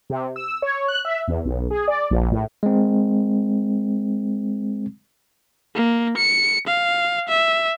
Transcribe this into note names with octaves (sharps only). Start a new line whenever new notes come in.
C3
E6
C#5
F#6
E5
E2
B1
G#4
D5
A#1
A2
G#3 C4
A#3
C#7
F5
E5